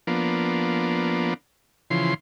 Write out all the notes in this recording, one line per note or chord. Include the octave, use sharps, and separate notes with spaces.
F3 A#3 B3 D4
C#3 E3 F3 C6